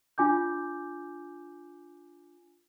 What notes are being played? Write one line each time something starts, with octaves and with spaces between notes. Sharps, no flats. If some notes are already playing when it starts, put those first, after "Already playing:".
D4 F4 G#5 D6 G6